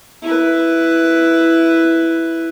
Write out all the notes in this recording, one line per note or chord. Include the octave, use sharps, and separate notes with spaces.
E4 B4